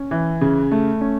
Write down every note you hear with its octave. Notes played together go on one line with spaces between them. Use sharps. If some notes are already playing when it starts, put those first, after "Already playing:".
Already playing: C#4
E3
C#3
A3
C#4